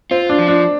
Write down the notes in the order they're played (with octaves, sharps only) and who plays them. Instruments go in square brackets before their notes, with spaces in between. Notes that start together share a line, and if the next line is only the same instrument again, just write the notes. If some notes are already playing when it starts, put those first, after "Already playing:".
[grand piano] C4 [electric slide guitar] F4
[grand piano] D4
[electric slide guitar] F3
[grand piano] D4